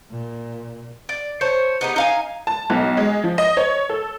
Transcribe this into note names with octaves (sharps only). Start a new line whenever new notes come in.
A#2
D5
C5 C#5 A5
B3 D#4 G4
D#4 F5 G#5
A5
B1
G#3
F3
D#5
C#5
A4